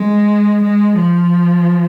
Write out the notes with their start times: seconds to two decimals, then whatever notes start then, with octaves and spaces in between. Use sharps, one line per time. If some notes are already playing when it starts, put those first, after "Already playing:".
Already playing: G#3
0.62 G#3
0.98 F3